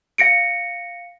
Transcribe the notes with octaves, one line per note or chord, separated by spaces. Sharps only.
F5 A#6 C#7 D7